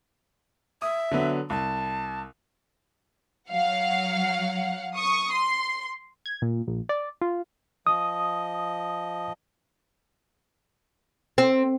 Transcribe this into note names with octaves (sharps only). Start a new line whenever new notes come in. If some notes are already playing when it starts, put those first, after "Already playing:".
E5 D#6
D3 F#3 B3
C2 A5
F#3 F5 F#5
C#6 D#6
C6
G#6
A#2
A#1
D5
F4
F3 D#5 D#6
C4